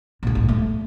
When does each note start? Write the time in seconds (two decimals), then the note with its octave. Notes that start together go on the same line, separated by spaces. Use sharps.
0.23 C#2 A#2
0.35 A1
0.49 A3